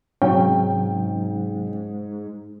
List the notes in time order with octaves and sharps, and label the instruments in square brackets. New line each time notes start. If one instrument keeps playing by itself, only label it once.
[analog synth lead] G#2 [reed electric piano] C3 F#3 C#4 [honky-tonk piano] G5